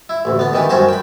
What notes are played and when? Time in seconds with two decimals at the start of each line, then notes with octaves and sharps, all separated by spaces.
0.09 E4
0.25 A1 D2
0.39 B3 D4
0.53 D#3 E3 D4 G4
0.70 F#2 G3 C#4 F#4 C5 A5
0.89 G5 B5